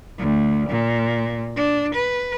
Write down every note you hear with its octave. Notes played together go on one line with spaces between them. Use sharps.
D2
A#2
D4
B4